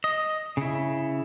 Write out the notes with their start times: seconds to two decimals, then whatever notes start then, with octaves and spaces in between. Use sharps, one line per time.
0.04 D#5
0.57 C#3 E4